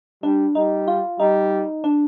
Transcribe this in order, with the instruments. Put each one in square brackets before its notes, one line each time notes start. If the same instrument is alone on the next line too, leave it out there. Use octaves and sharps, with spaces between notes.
[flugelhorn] G3 [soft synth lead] D4
[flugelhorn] G3 [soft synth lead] D#4
[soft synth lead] F4
[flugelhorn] G3 [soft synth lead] D#4
[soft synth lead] D4